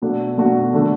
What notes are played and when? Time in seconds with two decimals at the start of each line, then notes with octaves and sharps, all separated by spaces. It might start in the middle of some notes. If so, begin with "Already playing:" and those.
0.02 B2 A3 D4 F#4
0.38 B2 A3 D4 F#4
0.73 D3 A3 D4